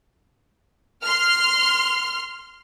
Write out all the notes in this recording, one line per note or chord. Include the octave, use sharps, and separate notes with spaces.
C6 F6